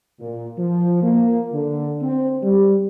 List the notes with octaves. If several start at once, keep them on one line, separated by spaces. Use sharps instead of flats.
A#2
F3
A#3
D3
C4
G3